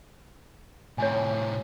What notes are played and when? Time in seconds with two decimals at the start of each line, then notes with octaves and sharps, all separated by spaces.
0.98 A2 C3 C#5 G#5